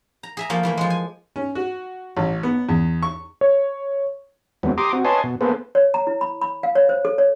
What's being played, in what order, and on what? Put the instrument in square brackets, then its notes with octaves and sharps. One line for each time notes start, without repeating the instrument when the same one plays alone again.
[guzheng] A#5
G#4 E5 A#5
F3 A3 A#3
E3 A3 A#3
F3 G#3
G#5
[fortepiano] C#4
F#4
A1
B3
E2
C#6
[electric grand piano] C#5
[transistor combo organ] D#2 F#3 G#3 B3 C4
G4 A#5 C6 D6 D#6
C4 F#4
B4 C#5 D#5 G#5 A5 C6
B2
A#3 B3 G#4 A4 B4 C5
[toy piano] C#5
A#5
E4
B5
B5
F5
C#5
C5
A4
C#5